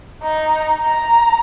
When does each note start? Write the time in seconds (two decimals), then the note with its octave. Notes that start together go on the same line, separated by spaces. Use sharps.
0.23 D#4
0.81 A#5